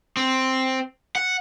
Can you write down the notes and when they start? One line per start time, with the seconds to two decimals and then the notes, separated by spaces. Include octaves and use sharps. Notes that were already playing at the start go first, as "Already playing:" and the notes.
0.17 C4
1.16 F#5